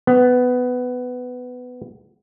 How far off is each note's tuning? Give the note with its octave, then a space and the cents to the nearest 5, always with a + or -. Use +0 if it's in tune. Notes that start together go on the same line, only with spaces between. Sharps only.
B3 +15